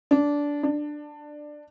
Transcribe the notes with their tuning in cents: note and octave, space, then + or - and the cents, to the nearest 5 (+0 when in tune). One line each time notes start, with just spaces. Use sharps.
D4 -15
D4 +15